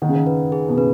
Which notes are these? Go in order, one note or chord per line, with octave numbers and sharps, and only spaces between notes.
D#3 F#5
C#3
D#3
B4
G#4
B2
C#3 B4